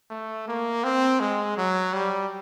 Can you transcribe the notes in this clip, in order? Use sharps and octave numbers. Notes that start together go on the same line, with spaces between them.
A3
A#3
C4
G#3
F#3
G3